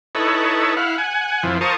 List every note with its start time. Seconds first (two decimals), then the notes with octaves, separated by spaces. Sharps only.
0.15 D#4 E4 A4 B4 C#5
0.77 E4 F5 F#5
0.98 F#5 G#5
1.43 F2 E3 F3
1.61 F4 A#4 C5 A5 C#6 D#6